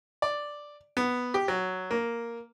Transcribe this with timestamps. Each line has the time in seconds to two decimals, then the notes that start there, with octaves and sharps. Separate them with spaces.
0.22 D5
0.97 B3
1.34 G4
1.48 F#3
1.91 A#3